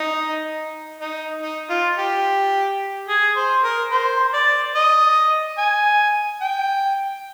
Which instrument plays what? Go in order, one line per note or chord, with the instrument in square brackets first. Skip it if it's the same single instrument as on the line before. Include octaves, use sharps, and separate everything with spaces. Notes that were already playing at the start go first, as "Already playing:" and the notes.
Already playing: [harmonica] D#4
D#4
D#4
F4
G4
G#4
C5
A#4
C5
D5
D#5
G#5
G5